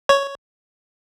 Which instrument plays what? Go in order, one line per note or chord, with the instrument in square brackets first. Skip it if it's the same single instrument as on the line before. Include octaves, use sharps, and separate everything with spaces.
[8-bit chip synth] C#5